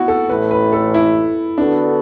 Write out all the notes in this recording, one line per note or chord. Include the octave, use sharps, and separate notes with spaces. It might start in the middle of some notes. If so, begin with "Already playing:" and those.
Already playing: B3 E4 F#4
A4
A1 A2 E3 A3 B4
B4
A4
E4
D3 B3 D4 F#4 A4